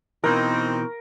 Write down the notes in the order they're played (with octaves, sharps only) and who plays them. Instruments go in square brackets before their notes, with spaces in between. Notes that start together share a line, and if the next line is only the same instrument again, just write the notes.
[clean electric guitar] B2 E3 [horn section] C4 D#4 [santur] A#4